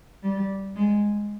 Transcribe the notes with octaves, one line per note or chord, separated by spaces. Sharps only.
G3
G#3